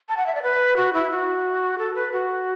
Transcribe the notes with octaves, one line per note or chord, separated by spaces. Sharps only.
A5
F#5
E5
D5
B4
F#4
E4
F#4
A4
B4
F#4